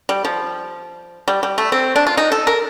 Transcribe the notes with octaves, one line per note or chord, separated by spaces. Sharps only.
G3
F3
G3
G3
A3
C4
D4
F4
D#4
A4
A#4